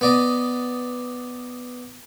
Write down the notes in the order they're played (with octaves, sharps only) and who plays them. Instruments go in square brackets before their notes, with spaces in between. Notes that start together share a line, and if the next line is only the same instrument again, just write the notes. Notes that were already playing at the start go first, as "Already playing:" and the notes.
[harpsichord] B3 D5 D#5